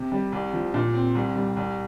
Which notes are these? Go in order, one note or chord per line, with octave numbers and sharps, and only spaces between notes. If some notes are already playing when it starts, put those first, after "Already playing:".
Already playing: C3
G3
C2
F3
A#2
C4
C2
G3
C2